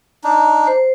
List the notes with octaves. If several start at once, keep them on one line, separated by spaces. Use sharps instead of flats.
D4 D#4
C5